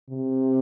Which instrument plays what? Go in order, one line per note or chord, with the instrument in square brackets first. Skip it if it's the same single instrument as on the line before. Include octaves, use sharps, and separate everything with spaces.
[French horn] C3